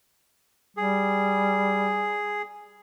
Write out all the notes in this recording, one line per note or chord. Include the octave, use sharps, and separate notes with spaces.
G3 G#4